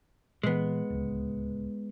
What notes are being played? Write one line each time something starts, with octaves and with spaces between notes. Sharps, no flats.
A#2 E3 G#3 B3
D1 C#2